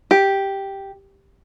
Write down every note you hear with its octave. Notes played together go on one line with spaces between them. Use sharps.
G4